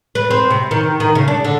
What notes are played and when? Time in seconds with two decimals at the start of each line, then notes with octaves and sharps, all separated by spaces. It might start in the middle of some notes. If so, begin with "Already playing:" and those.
0.15 B4
0.31 C4
0.51 C3
0.71 D#3
1.00 D#3
1.15 C#3
1.28 D4
1.45 D3